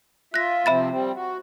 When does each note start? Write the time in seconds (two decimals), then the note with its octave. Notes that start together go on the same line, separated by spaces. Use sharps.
0.34 F4 E5 F#6 A#6
0.66 C3 F3 C4 E5 B5 A6
0.90 G3 C4
1.14 F#4